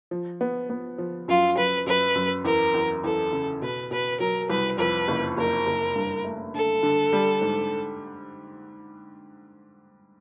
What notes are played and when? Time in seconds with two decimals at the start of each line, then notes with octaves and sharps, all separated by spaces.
0.11 F3
0.41 B3
0.70 B3
0.98 F3
1.28 F#2 F4
1.57 F#2 B4
1.86 F#2 B4
2.15 F#2
2.45 E2 A#4
2.74 E2
3.03 E2 A4
3.33 C#3
3.62 B2 B4
3.91 B2 B4
4.20 F#3 A#4
4.49 C2 B4
4.78 F2 B4
5.08 F#1
5.37 F#1 A#4
5.67 F#1
5.96 G2
6.25 A3
6.54 D3 A4
6.83 D3
7.13 G3
7.41 G#2